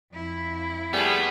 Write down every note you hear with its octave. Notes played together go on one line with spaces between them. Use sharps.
F2 E4
C3 G3 A3 B3 G#4